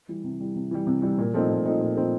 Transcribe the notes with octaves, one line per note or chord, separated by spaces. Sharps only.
E3 G3
C3
E3 G3
C3
E3 G3
C3
E3 G3
A#2
F3 A3 C4 D#4
A#2
F3 A3 C4 D#4
A#2
F3 A3 C4 D#4